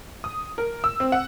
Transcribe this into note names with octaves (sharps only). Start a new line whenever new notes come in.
D#6
A#4
E6
C4
F#5